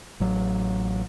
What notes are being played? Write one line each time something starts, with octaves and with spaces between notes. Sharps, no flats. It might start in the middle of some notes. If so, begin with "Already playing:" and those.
A1 F#3